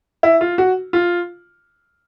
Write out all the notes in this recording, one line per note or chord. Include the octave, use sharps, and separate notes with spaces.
E4
F4
F#4
F4